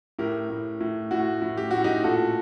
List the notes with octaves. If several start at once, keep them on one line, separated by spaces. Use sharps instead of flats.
A2 G4 A#4
A2
A2
A2 F#4
A2
G4
A2 F#4
D#4 G4
A#2 F#4 A4